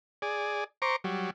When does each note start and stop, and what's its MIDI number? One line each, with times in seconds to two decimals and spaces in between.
0.22 0.64 68
0.22 0.64 74
0.82 0.96 72
0.82 0.96 82
0.82 0.96 85
0.82 0.96 86
1.04 1.30 54
1.04 1.30 55